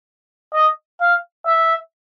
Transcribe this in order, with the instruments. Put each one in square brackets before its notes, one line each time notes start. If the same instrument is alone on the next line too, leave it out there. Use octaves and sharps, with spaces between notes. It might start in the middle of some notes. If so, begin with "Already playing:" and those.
[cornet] D#5
F5
E5